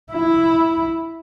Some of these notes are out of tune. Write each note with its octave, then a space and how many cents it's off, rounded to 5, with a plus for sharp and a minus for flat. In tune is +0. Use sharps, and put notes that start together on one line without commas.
E4 +0